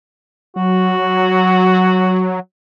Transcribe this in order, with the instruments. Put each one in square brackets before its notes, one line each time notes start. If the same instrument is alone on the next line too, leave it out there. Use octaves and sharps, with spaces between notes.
[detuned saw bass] F#3 [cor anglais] F#4